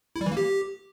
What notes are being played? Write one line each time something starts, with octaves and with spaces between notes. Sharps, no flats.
E4
G3
E3
A#3
G4